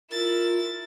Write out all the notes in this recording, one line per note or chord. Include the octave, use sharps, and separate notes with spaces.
E4 F4 A#4 A6